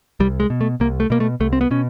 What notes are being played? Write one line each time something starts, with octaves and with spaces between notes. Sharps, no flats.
C2 G3
G#3
B2
A3
C2 A#3
A3
B2 A#3
A3
C2 A3
C4
B3
B2 C#4